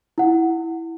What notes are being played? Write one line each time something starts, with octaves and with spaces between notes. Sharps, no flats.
E4 F#5